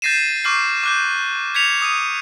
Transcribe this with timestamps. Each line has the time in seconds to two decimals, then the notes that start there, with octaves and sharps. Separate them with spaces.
0.02 G6 A6 A#6 C7 D#7 E7
0.44 C#6 D6 F6 G6 C7
0.83 D6 F#6 G6
1.55 G#6 B6 C#7 F7
1.82 D#6 D#7